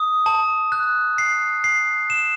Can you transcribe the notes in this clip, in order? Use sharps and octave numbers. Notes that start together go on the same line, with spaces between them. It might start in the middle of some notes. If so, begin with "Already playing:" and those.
Already playing: D#6
A5
F#6
C7
C7
E7